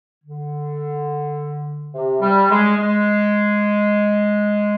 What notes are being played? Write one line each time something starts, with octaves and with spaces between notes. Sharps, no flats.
D3
C3
G3
G#3
G#3